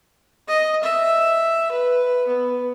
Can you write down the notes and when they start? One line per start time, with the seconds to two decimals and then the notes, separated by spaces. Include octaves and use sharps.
0.48 D#5
0.84 E5
1.72 B4
2.28 B3